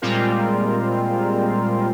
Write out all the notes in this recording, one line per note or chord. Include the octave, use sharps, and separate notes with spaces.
A#2 G3 G#3 C4 F4 A#4